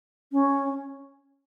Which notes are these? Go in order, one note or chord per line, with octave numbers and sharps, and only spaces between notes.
C#4